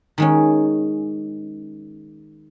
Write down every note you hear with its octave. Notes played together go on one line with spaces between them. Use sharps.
D#3 G#3 C#4